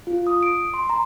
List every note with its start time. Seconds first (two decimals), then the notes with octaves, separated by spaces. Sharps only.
0.07 F4
0.27 D#6
0.43 D7
0.74 C6
0.90 A#5